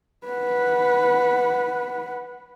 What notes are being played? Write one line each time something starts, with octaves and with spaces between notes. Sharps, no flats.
B4 F#5